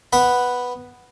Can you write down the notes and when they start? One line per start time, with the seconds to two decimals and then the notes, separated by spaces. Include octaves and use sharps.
0.13 B3 F#5 B5